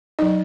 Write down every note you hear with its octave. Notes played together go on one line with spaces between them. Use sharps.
F#3 D#4 D#5